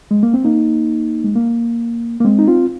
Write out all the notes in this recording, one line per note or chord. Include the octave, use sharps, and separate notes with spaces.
G#3
A#3
C4
A#3 D#4
G#3
A#3
A#3
G#3 C4
D#4
C4 F4